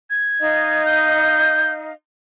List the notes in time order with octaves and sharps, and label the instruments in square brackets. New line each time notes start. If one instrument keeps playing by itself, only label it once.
[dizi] G#6
[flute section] D#4 D#5 F5
[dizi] G6